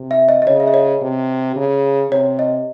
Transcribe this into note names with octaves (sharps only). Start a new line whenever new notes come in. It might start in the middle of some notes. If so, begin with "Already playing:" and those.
Already playing: C3
E5
D#5
D#5
C#3 C#5
E5
D#5
C#5
C3
C#3
C3 C#5
D#5